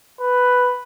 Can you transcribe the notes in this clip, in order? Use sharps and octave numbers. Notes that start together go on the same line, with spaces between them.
B4